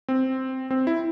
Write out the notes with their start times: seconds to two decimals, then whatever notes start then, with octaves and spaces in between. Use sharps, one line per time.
0.08 C4
0.71 C4
0.87 E4